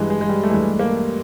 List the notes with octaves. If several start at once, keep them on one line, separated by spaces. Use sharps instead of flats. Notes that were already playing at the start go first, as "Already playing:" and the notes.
Already playing: G2 E3 G#3
G#3
G#3
G3
A3
G2 E3 G#3
A#3